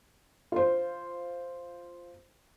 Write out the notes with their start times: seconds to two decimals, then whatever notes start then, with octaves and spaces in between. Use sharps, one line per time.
0.52 F4 C5